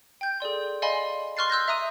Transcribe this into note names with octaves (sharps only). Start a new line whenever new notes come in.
G5 G6
G#4 A4 D5 C6
D5 D#5 F5 G#5 B5 C6
C6 C#6 F6 F#6 A6 C7
E6 F#6 G6 A#6
E5 A#5 D#6 D#7